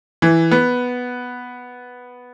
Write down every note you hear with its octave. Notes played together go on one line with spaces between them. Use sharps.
E3
B3